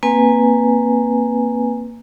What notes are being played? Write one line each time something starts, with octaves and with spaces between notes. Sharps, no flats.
A#3 C4 B4 G#5